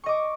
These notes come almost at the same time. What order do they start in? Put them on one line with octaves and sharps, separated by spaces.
C#6 D#5 D6